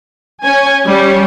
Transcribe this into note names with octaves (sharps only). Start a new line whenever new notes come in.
C#4 G#5
G3 C#4